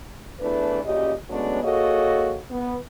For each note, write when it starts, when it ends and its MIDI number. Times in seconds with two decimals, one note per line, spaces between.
0.41 0.79 40
0.41 0.79 52
0.41 0.79 57
0.41 0.79 62
0.41 0.79 71
0.84 1.13 42
0.84 1.13 46
0.84 1.13 49
0.84 1.13 67
0.84 1.13 75
1.30 1.61 54
1.30 1.61 56
1.30 1.61 57
1.30 1.61 59
1.30 1.61 61
1.30 1.61 62
1.62 2.37 58
1.62 2.37 66
1.62 2.37 68
1.62 2.37 69
1.62 2.37 73
1.62 2.37 75
2.50 2.75 59